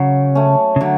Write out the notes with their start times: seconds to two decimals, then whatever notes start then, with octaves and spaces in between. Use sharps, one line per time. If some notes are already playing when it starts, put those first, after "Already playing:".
Already playing: C#3 F#3
0.35 A3 C#4
0.76 C#3
0.81 D3 F#3